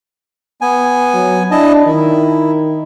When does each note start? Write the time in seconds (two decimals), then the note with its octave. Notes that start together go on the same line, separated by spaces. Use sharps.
0.61 B3 G#5
1.14 F#3
1.51 D4 E4 D#5 A5
1.86 D#3 E4